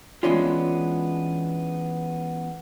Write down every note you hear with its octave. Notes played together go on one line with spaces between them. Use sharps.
E3 G#3 B3 C#4 D4 F4